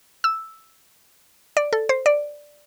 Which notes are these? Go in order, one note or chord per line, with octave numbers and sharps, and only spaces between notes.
E6
D5
A4
C5
D5